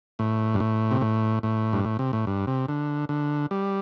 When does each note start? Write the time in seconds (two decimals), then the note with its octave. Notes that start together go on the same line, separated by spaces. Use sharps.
0.19 A2
0.54 G2
0.60 A2
0.91 C3
1.01 A2
1.43 A2
1.73 G2
1.85 A2
1.99 C3
2.13 A2
2.27 G2
2.47 C3
2.68 D3
3.09 D3
3.51 G3